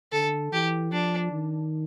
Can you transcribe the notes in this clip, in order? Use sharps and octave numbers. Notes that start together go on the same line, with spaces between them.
D3 A4
E3 G4
F3 D4
D#3